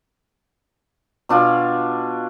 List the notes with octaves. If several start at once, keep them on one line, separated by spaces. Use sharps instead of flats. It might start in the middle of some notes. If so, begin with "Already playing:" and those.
B2 D4 F4 G#5